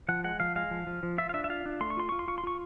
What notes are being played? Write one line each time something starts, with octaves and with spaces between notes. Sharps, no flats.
F3 F#5
G#3 F#5
F3 F5
G#3 F5
F3
F3
F3
F4 E5
F5
D4 E5
E5
F4 F5
D4
A3 C6
C#6
F4 C6
F4 C#6
C6
F4 C#6
C6
F4 C#6